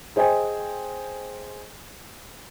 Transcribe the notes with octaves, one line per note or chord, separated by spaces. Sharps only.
G#4 C5 D#5 G5 G#5